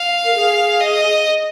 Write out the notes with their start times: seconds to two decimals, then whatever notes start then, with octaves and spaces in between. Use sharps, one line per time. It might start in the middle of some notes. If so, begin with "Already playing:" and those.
Already playing: F5
0.25 A#4
0.35 G#4
0.80 D#5